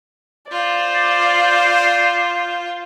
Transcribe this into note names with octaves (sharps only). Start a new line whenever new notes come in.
F4 C5 D5